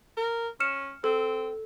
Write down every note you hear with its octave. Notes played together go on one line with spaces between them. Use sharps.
A#4
C#4 F6 C#7 E7
C4 A4